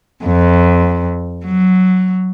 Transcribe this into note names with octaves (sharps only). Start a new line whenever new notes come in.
F2
F#3